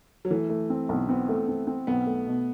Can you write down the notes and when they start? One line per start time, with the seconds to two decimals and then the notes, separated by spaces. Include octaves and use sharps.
0.25 F#3
0.30 E3 A3
0.50 A3
0.70 C4
0.89 B1
1.09 B3 C4
1.29 A3
1.48 C4
1.67 C4
1.87 B1 B3
2.06 A3
2.27 B2